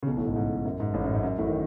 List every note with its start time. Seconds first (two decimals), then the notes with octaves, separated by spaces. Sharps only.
0.03 C#3
0.07 B1 B2
0.17 A1 A2
0.26 G#2
0.36 G#2
0.65 F#2
0.80 G#2
0.94 A1 A2
1.04 F#2
1.13 G#2
1.23 F#2
1.38 A1 A2
1.47 D#3